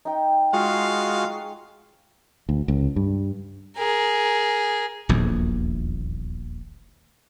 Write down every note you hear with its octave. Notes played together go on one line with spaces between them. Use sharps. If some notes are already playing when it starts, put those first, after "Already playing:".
D#4 G5
G#3 F4 F#4 G#4 F5
D2
C#2
G2
G#4 A#4
D#1 A#1 E2